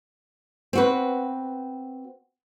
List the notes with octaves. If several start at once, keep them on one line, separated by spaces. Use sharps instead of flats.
C4 F#4 B4